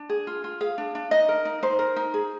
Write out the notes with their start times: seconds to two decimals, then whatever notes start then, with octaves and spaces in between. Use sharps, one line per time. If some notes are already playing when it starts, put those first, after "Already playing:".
Already playing: D4
0.09 G#4
0.27 F4
0.44 F4
0.61 G#4 F5
0.78 D4
0.95 D4
1.11 D#4 D#5
1.29 A#4
1.45 D#4
1.62 D#4 C5
1.79 A#4
1.96 D#4
2.14 G#4